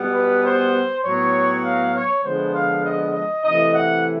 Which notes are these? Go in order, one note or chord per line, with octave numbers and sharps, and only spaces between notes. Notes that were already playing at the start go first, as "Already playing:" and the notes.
Already playing: B2 G3 B3
B4
C5
A2 F#3 B3 C#5
F5
C#5
D3 F3 G#3 B3 C5
F5
D#5
D#5
C3 E3 A3 D#5
F#5